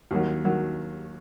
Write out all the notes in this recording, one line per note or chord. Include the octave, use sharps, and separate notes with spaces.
D#2 D#3 F#3
D#3 F#3